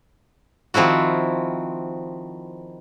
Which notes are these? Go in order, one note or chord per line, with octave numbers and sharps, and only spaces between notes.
D#3 F3 C4 E4 F#4